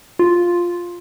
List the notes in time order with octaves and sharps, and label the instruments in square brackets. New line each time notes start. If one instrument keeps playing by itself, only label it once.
[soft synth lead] F4